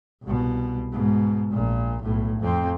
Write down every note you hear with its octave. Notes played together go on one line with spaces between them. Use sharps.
C2 B2
G#2 B2
A#1 A#2
B1 A2
F2 C4